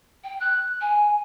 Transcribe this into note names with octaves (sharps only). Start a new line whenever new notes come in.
G5
F#6
G#5